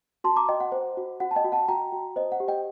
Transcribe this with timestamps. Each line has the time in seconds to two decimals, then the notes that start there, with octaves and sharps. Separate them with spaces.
0.24 F#4 A5 C6
0.36 A#5 D6
0.49 F#4 D#5 G5
0.60 F#5
0.72 C5
0.97 F#4
1.20 F#4 F#5
1.31 A5
1.36 D#5 G5
1.44 F#4
1.52 F#5 A5
1.68 F#4 G5 A#5
1.92 F#4
2.16 C5 D#5
2.32 F#5
2.40 G4
2.48 D#5 G5